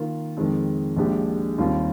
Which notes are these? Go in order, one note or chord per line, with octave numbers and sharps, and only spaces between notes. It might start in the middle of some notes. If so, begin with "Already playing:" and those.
Already playing: D#3 A#3 F4
F2 D#3 G#3 C4
A#1 A#2 G#3 D4 G4
D#2 D#3 G3 C4 F4